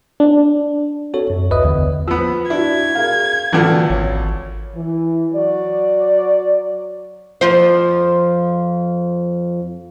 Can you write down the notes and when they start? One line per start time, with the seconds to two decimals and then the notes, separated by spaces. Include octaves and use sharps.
0.20 D4
1.14 C4 F#4 A4 C#5
1.30 F#2
1.51 G#1 D2 B4 D#5 E5 D#6
1.65 E2 D3
2.08 F3 B3 E6
2.50 D4 E4 F#4 G#6
2.95 G#4 A#4 F5
3.52 C#2 A#2 D3 E3 D4 F4 F#4
3.90 G#1 C#5
4.75 E3
5.33 F#3 F#4 D5
7.41 F2 F3 C5